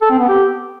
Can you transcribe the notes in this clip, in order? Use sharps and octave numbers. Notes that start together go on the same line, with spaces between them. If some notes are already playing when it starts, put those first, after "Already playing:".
A4
C4
B3
G4